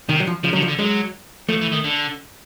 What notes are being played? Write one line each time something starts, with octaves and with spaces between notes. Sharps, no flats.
C3 D#3
F#3
F3
C#3 F3
F#3
D3
F3
D3
F#3 G#3
F3 A3
E3
D#3
D3